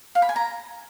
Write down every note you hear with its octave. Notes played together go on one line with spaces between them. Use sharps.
F5
B5
G#5
A#5